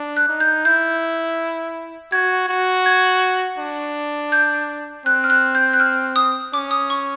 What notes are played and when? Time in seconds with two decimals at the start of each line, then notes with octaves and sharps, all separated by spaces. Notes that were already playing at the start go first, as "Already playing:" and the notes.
Already playing: D4
0.17 F#6
0.29 D#4
0.40 G6
0.65 E4 G6
2.12 F#4 G#6
2.49 F#4
2.86 G#6
3.59 D4
4.32 G6
5.06 C4 F#6
5.24 F6
5.30 F#6
5.55 G6
5.73 F#6
5.80 F6
6.16 D#6
6.53 C#4 D6
6.71 D#6
6.90 C#6